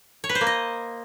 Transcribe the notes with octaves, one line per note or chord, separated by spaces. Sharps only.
C#5
B4
C5
A#3
D#5